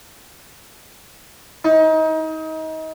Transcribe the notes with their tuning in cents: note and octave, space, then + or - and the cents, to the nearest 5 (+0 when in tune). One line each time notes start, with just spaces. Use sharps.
D#4 +30